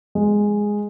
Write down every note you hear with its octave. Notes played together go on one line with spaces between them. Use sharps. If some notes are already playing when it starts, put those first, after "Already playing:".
G#3